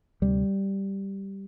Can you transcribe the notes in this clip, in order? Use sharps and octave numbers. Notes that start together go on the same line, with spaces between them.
D2 C3 G3